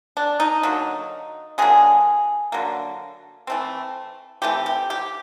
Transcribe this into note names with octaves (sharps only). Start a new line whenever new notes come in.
D4
D#4
D3 F#3 A#3
D3 F#3 A#3 G#4
D3 F#3 A#3
E3 A3 C4
E3 A3 C4 G4
G4
G4